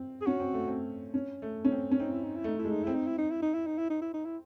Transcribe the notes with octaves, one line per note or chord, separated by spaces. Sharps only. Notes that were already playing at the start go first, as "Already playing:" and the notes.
Already playing: C4
G#4
C#4 F#4
C4
A3
C4
C#4
A3
C#4
C4
C#4
C4 D#4
E4
D#4
E4
A3 D#4
E4
G#3
D#4
C4 E4
D#4
E4
D#4
E4
D#4
E4
D#4
E4
D#4
E4
D#4
E4